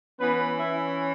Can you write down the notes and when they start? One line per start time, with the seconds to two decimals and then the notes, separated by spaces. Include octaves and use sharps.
0.20 E3 B3 C#4 B4
0.59 E4 E5